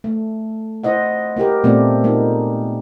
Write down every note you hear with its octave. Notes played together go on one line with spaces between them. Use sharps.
A3
E4 C5 D#5 F#5
A#3 E4 G4 A#4
A#2 A3 B3 C4 D5
G#3 A#3 D#4